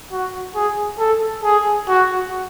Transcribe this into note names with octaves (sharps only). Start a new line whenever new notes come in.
F#4
G#4
A4
G#4
F#4